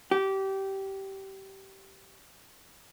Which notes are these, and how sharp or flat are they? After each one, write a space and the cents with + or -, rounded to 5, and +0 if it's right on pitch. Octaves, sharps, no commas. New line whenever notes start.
G4 -20